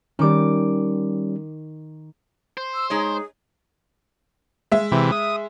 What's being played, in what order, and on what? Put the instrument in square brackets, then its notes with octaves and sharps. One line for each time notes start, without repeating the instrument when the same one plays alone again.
[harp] D#3 D6 [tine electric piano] G3 C#4
[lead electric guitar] C5
[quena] E6
[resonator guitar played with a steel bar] G#3 D#4 C#5 [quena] G#4
[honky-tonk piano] G#3 E5
[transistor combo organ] C3 E3
D#6